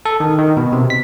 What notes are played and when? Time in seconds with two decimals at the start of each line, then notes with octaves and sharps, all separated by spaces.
0.05 A4
0.20 D#3
0.38 D#3
0.57 B2
0.73 C3
0.90 B6